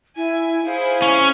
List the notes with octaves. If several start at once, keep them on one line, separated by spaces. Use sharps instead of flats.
E4 G#5
E4 G#4 C5 F5
C#4